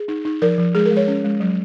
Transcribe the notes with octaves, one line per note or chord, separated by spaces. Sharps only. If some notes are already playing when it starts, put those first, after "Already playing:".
Already playing: G#4
D#4
D#4
F3 A#4
F3
G#3 G#4
A#4
G#3
C#5
C#4
G#3
F#3